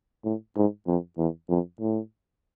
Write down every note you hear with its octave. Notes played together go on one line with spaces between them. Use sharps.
A2
G#2
F2
E2
F2
A2